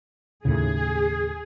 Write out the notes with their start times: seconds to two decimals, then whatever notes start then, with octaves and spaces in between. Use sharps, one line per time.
0.45 D#2 A2 C#3 G#4